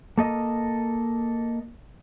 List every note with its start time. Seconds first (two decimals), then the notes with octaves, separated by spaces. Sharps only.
0.18 A#3 A4 D#5